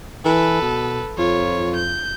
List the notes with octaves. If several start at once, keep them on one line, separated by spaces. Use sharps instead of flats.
E3 A4 B4
B2
F2 F4 C#5
G6